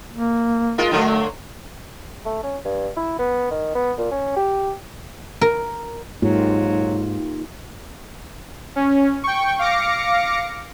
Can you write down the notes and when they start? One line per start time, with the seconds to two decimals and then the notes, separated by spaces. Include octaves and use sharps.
0.12 A#3
0.78 G#3 F4 A#4
0.91 D3 F#3 A3 A#3
2.25 A3
2.43 C#4
2.65 G2
2.96 E4
3.19 B3
3.51 D#3
3.75 B3
3.98 A#2
4.11 C#4
4.36 G4
5.41 A#4
6.22 G#2 F#3 A#3 D#4 F4 G4
8.76 C#4
9.24 G5 C#6
9.59 F5 D6 A#6 C#7